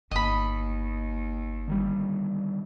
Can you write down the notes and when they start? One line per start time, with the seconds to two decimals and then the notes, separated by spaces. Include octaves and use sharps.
0.11 G1 D#2 D#5 B5
1.68 D3 D#3 G3